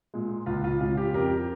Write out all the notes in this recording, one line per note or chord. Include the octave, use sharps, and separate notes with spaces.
A#2 G#3
C#2 F4
F4
C#3 G#3 F4
G4
F2 G4 A#4